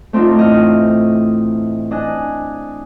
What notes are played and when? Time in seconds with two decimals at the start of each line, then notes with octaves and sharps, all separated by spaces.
0.13 A3 C4 D4 D#4 F4
0.36 A2 E3 D#5 F6
1.91 D4 D#5 G#5 F#6